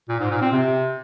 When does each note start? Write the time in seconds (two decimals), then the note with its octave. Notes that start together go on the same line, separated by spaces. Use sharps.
0.09 A#2
0.20 G#2
0.30 A#2
0.41 C4
0.52 C3